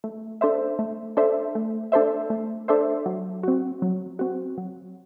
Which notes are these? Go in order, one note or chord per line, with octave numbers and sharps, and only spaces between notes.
A3
D4 A4 C5 E5
A3
D4 A4 C5 E5
A3
D4 A4 C5 E5
A3
D4 A4 C5 E5
F#3
C4 F#4
F#3
C4 F#4
F#3